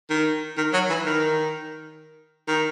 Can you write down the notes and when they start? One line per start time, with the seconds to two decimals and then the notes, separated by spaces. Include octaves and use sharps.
0.10 D#3
0.57 D#3
0.73 F#3
0.90 E3
1.05 D#3
2.48 D#3